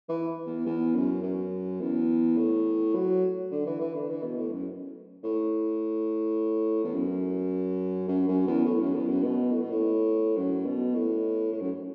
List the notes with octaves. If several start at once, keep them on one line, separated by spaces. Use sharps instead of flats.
E3
E2
E2
F#2
F#2
E2
A2
F#3
D3
E3
E3
D3
E3
B2
A2
F#2
A2
E2
F#2
F#2
F#2
E2
A2
F#2
E2
F#2
B2
A2
B2
A2
F#2
B2
A2
A2
F#2